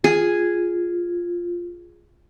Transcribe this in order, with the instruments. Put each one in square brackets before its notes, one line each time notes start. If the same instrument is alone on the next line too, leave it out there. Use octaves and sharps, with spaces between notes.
[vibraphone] F4 [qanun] G#4